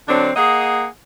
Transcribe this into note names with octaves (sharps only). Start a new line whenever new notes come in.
D3 F#3 C4 D4
A#3 G#4 D#5 F#5